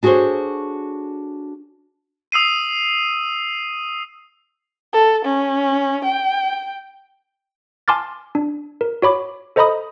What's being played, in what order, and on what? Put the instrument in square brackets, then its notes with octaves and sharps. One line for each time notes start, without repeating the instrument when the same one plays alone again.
[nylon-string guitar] D4 F#4 G#4 A4 C5 C#5
[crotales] D#6 E6 C7 D#7
[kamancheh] A4
C#4
G5
[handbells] G#5 A5 C6 D6 F6 A6
D4
A#4
F#4 C#5 B5 D6
A4 C5 D#5 A#5 B5 D#6